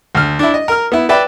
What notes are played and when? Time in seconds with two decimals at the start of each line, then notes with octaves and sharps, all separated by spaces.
0.15 D2 F6
0.39 D4 E4
0.54 D#5
0.68 A#4 F6
0.92 B3 E4
1.09 B4 D5 E5 G5